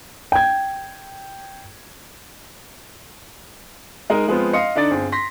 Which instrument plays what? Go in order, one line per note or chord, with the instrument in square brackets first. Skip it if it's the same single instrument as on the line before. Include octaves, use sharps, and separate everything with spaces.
[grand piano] G5 G#6
[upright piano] G#3 D#4 A#4
F3 G#3 B3 C4 F4
D#5 F5 C6 C#7
D3 D4 D#4 D5 A6
G1 C4 G#4
C6 A#6 B6